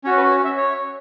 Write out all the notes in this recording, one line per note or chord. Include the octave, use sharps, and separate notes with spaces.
C#4 F#4 C#5
B4
C#5
E5
C#5